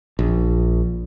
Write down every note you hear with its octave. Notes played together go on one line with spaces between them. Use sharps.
A#1